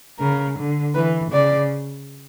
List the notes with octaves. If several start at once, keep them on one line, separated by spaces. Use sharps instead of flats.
C#3 A#4
D3
E3 B4
C#3 D5